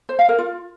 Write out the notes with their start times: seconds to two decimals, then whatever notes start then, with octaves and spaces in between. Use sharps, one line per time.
0.09 C5
0.19 F5
0.29 A#4
0.38 F4